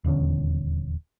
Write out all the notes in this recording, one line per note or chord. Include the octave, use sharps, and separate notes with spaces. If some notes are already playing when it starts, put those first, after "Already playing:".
D#1 E2 D3 C#4